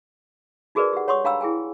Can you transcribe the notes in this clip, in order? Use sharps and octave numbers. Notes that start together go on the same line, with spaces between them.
D#4 F#4 G#4 A#4 B4 D5
G4 F#5
C#5 F#5 C6 C#6 D#6
D4 F5 G5 A#5 B5 E6
E4 G#4 G5 G#5